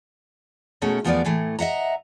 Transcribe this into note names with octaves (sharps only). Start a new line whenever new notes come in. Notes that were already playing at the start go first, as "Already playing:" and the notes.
B2 A3 C#4 G#4 A#4
E2 F3 A3 B3 A#4 D5
A2 E3 A3
D#5 E5 F#5 A#5